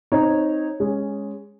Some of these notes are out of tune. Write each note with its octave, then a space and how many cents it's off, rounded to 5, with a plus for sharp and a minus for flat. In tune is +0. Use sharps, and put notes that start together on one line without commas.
C4 +0 D#4 +0 C#5 -15
G#3 -10 C#4 +0